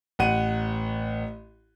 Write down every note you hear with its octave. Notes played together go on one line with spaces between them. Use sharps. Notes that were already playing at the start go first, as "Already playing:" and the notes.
A1 F#5 D#7